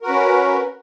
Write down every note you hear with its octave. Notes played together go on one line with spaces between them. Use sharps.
C#4 F#4 A#4 B4